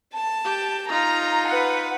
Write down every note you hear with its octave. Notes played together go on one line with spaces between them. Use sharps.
A5
G4
D#4 F4 A#5
B4 F#5